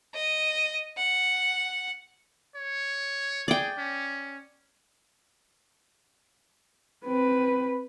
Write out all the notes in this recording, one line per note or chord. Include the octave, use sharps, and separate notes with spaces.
D#5
F#5
C#5
G#4 D5 G5
C#4
C4 B4